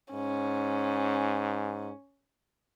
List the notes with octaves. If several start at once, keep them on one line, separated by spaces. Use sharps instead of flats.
G#2 C#4